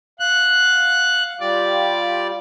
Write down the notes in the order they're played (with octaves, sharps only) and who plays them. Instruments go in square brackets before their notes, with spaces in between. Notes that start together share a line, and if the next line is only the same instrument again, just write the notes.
[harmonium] F5 F#5 [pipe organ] F#6
[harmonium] G3 F4 G4 [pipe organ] D5